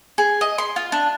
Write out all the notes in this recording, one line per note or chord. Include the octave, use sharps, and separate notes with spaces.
G#4
D#5
C6
F4
D4